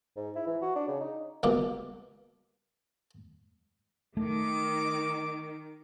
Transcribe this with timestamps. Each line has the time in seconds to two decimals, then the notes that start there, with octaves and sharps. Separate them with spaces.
0.16 G#2
0.36 E4
0.47 E3
0.62 F#4
0.75 D4
0.88 C#3
1.00 D#4
1.43 C#2 B2 G3 A#3 D6
4.17 D#3 A3 D6